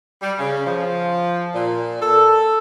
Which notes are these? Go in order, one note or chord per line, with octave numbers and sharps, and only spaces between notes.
G3
C#3
F3
A#2
A4